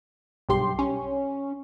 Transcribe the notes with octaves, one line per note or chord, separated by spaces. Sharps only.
B1 G2 G4 C6
C#4